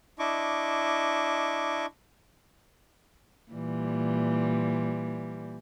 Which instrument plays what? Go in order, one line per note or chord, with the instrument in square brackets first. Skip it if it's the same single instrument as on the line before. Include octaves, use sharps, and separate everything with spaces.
[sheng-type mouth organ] D4 E4 D#5 C#6 D6
[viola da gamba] A#2 E3 G3